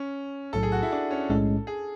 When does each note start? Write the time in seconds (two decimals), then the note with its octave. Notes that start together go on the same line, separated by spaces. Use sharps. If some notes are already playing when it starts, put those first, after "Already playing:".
Already playing: C#4
0.53 B1 A2 F#3 A4
0.63 G#4
0.72 F#4
0.82 E4
0.92 D4
1.11 C#4
1.30 B1 A2 G#3 C#4 A4
1.67 G#4